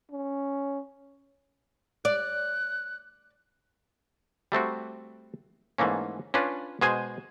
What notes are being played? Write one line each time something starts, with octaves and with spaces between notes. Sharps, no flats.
C#4
D5 F#6
G3 A3 C4 F#4
G#2 E3 A3 A#3 C#4
C#4 D4 F4 B4
B2 G#3 G#4 C5 G#5